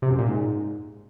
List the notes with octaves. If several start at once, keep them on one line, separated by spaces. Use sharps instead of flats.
C3
F#2
A#2
G#2